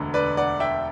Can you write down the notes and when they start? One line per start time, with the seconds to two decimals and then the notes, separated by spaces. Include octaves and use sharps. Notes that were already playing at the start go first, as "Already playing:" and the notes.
Already playing: E1 D2 D3
0.14 B4 D5
0.37 D5 F#5
0.60 E5 G5